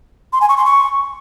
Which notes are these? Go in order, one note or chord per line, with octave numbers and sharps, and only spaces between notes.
C6
G#5
C#6
C6
C#6